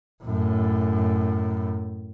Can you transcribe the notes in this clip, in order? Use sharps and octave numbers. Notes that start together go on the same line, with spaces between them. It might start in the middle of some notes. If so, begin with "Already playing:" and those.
F#2 A2